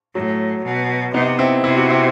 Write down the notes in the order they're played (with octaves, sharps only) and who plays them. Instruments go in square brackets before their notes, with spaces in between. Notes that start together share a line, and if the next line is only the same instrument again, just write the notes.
[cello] A2 [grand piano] F#3
[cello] B2
[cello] C3 [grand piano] B3 D#4
[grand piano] C4 E4
[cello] C3 [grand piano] E4
[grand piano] F#4
C4 E4